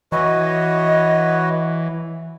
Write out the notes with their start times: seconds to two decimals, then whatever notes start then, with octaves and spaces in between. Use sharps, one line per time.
0.12 E3 F#4 B4 C#5 D#5